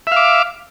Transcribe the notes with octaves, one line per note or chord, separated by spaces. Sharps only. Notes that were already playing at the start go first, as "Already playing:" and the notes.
E5 F5 D6